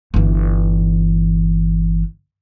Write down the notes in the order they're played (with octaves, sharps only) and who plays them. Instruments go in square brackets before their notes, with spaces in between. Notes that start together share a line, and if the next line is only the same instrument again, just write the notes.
[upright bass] G1 E3